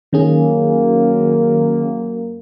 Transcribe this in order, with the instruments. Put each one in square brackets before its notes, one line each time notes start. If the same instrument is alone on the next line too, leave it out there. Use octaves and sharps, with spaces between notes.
[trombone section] F#2 A#3 [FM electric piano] D#3 C#4 G#4